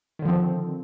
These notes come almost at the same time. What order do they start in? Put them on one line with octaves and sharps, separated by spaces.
D#3 D3 F3 C4